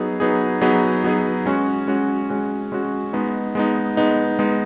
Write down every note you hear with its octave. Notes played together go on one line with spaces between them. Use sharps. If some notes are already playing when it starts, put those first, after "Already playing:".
Already playing: F#3 B3 D#4 G#4
F#3 B3 D#4 G#4
F#3 B3 D#4 G#4
F#3 B3 D#4 G#4
G#3 C#4 F#4
G#3 C#4 F#4
G#3 C#4 F#4
G#3 C#4 F#4
G#3 B3 D#4
G#3 B3 D#4
G#3 B3 D#4
G#3 B3 D#4